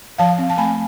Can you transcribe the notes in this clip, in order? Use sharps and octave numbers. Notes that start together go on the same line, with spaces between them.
F3 F5 A5
C4
A5
A3 G#5 B5